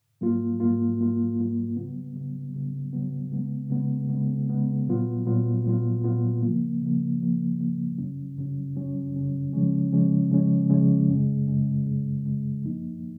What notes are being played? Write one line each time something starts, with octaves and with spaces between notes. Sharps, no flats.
G#2 F#3 A#3 F4
G#2 F#3 A#3 F4
G#2 F#3 A#3 F4
G#2 F#3 A#3 F4
C#3 F#3 B3
C#3 F#3 B3
C#3 F#3 B3
C#3 F#3 B3
C#3 G#3 B3
C#3 G#3 B3
C#3 G#3 B3
C#3 G#3 B3
A#2 F#3 B3 F4
A#2 F#3 B3 F4
A#2 F#3 B3 F4
A#2 F#3 B3 F4
C#3 F3 A#3
C#3 F3 A#3
C#3 F3 A#3
C#3 F3 A#3
F#2 C#3 F#3 C#4
F#2 C#3 F#3 C#4
F#2 C#3 F#3 C#4
F#2 C#3 F#3 C#4
C#3 F3 G#3 C#4
C#3 F3 G#3 C#4
C#3 F3 G#3 C#4
C#3 F3 G#3 C#4
F#2 C#3 G#3
F#2 C#3 G#3
F#2 C#3 G#3
F#2 C#3 G#3
F#2 F3 A#3 D#4